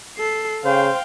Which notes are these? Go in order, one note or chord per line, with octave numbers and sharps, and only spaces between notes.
A4 C7
C#3 C5 F5 G5